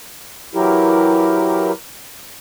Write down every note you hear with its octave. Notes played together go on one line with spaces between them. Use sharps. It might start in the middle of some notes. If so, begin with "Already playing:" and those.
E3 F#3 E4 G4 A#4